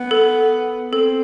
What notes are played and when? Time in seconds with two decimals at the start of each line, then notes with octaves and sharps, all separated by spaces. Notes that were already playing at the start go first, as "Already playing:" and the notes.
Already playing: B3
0.11 A4
0.92 C4 A4